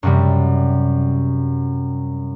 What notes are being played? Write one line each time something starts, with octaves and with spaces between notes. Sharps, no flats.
F#2 C3 G3